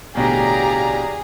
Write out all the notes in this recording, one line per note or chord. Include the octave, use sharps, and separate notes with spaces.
A1 B2 D3 G4 G#4 D5 F5 A#5